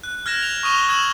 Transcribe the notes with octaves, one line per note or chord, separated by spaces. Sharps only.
F#6
F6 G#6 A#6 E7 F#7
F7
C#6 D#6 D#7 F7 G7
C#6 D#6 E6 G#6 E7 F#7